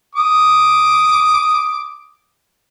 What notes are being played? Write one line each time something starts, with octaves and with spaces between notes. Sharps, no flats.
D6 D#6